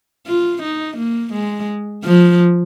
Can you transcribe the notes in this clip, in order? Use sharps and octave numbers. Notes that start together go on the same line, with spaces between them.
F4
D#4
A#3
G#3
F3